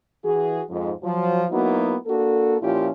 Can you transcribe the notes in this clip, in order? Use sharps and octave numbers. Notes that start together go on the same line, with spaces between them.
E3 F#4 G#4
F2 G#2 F3
F3 F#3
F#3 A#3 B3 D#4 E4 F#4
A#3 D4 F#4 A4
A#2 F3 C#4 E4 F4 G4